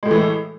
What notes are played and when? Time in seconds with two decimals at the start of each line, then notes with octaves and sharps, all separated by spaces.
0.03 G#3
0.05 A2
0.08 A3
0.11 E3